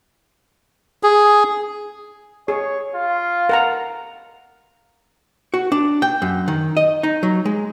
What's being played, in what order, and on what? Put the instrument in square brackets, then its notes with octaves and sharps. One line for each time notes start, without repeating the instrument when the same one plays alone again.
[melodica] G#4
[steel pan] G#4 [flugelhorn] C#5
[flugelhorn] F4
[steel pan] A#4 F#5 A#5
[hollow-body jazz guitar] F#4
D4
G5
F#2
D#3
D#5
D#4
F#3
G#3